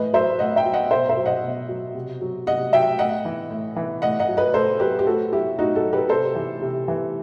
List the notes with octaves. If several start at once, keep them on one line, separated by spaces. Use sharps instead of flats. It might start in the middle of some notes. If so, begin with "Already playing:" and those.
Already playing: A2 E3 B4 D#5
F#3 C5 E5
A2 D#5 F#5
E5 G5
F#3
D#5 F#5
B2 C5 E5
C5 E5
F#3
D#5 F#5
B2
F#3
C3
F#3
C3 D#5 F#5
F#3 E5 G5
A2 D#5 F#5
E3
A2
E3
A2 D#5 F#5
D#5 F#5
F#3
B4 D#5
A2 A4 C5
F#3 G4 B4
G4
A2 F#4 A4
F#3 E4 G4
A2 D#4 F#4
F#4 A4
F#3
G4 B4
C3 A4 C5
E3
C3
E3